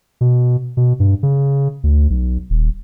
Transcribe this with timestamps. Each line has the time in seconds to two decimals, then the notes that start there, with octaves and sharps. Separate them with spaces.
0.21 B2
0.77 B2
1.00 G2
1.23 C#3
1.84 D2
2.10 B1
2.50 D#1